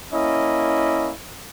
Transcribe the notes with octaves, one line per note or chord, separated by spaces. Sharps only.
A#3 C#4 E4 D#5